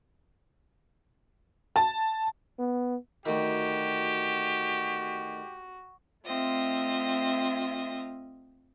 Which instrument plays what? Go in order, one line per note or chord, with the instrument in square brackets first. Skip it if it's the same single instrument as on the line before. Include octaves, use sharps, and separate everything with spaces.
[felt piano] A5
[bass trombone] B3
[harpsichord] D2 D#3 [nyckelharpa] F#4 [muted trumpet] G4
[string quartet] A3 C4 F4 D#5 E5